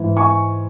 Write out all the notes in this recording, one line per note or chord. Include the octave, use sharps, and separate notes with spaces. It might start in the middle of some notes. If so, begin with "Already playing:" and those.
Already playing: G#2 E3
G#5 C#6